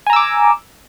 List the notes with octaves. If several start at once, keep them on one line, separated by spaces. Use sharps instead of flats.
G#5 A#5 D6 E6